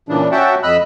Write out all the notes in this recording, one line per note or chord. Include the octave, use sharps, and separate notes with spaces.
A#2 C#3 E3 D4
C#4 F#4 E5 F#5 G5 A5
F2 D#5 B5 E6 F#6